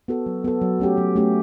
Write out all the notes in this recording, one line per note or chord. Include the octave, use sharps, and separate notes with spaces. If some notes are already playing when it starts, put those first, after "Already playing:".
B3 F#4 A4
F#3
B3 F#4 A4
F#3
A3 C#4 G4
F#3
A3 C#4 G4